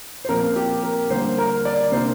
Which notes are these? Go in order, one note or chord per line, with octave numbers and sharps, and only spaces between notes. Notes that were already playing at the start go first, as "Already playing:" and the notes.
C5
A#2 F3 C4 A#4
G4
A#4
D3 G3 A#3 C5
A#4
D5
C3 A#3 D4 C5